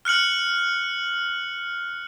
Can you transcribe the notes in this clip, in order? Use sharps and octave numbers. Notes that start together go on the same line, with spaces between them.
F6 F#6 C#7 F#7